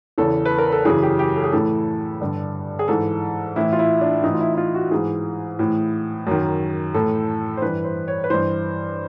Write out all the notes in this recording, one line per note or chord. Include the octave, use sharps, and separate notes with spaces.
E2 C#3 E3 A4
B4
A#4
A4
F#2 C#3 E3 G#4
G4
G4
A4
G#4
A2 E3 A4
G2 D3
G#4
G#2 E3 A4
A2 E3 E4
F4
E4
D4
A2 E3 D#4
F4
E4
E4
F4
F#4
G#2 E3 G#4
A2 E3
F#2 D#3
A2 E3 A4
C5
G2 E3 B4
C5
C#5
B4
G2 E3 C5